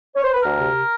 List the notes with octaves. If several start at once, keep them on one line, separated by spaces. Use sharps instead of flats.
C#5
C5
B4
D2 A#4
C3